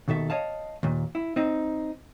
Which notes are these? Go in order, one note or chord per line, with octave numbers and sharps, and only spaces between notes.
D#2 B2 D#3 A4 E5
C#5 D#5 F5 A5
D#2 A#2
E4
C4 D#4